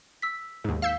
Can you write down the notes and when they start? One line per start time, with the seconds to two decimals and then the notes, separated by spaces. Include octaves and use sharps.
0.22 E6 B6
0.64 D#2 G#2
0.82 F5 E6 G6 B6